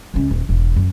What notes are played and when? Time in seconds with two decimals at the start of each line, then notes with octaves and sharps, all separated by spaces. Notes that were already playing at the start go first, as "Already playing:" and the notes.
0.14 C#2 C#4
0.31 D#1
0.49 E1
0.76 F#2